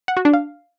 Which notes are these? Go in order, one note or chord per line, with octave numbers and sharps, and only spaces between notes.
F#5
F#4
D4
F5